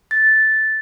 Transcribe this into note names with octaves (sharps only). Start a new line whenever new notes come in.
A6